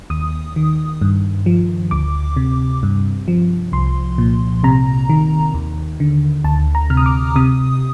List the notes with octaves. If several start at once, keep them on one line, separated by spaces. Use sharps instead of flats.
D#2 D#6
D#3
G2
F3
D2 D6
C3
G2
F3
C2 C6
A#2
C3 A#5
D#3
D#2
D3
D2 A5
A#5
C3 F6
D#6
D6
C3 D#6